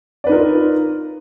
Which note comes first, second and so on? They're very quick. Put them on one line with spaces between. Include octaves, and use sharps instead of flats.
D5 B4 D#4 A#4 F4